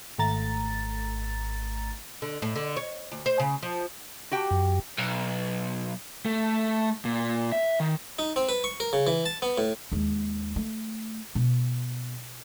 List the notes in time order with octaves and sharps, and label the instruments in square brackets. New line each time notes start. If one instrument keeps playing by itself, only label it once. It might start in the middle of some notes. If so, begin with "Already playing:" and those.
[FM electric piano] G#1 A3 A#5 A6
[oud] D3
A2
D3
C#5
D2
C5
C#3
F3
[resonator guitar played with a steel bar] F#4 G4 G5
[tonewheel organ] F#2
[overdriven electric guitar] B1
A3
A#2
E5
D#3
[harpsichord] D#4
C4
B4
C#6
A#4
C#3
E3
A5
B3
A2
[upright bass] D#2 G#3
A3
B2